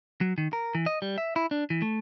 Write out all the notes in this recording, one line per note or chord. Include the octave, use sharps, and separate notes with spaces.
F#3
D#3
A#4
E3
D#5
G3
E5
E4
D4
E3
A3